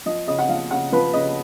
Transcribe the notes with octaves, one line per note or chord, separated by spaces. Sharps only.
F3 D#5
C#3 D#5
F#5
F3 F5
C#3 F#5
F3 B4
C#3 D#5